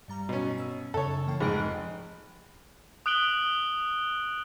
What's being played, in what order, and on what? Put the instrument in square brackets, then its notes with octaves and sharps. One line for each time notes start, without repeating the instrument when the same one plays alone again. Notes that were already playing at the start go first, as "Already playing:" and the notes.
[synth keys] G2 G3 A#5
[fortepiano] B2 C#4
[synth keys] E6
[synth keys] F#2 C#3 [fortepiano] A4 C#5
[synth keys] E3 A#3 G5
[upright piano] F1 [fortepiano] G#2 [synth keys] G#4 D#5 D7
[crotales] D#6 F#6 D7 F#7 G7